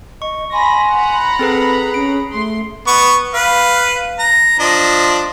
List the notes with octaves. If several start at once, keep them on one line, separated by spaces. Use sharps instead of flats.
D#5 C#6
G#5 B5 C6 A#6
F#5 A#5 B5
C4 G#4 A4 B4
C#4 D7
A3 C6
B3 C#6
B4 F5
A#5
F3 D4 D#5